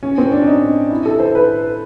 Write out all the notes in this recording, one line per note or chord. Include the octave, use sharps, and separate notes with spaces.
C#4
C4
D4
D#4
E4
A4
C5
B4